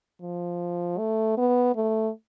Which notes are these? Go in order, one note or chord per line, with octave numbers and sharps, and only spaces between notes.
F3
A3
B3
A3